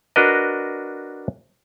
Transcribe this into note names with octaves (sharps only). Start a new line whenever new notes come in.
D4 F#4 A#4 B4 D#5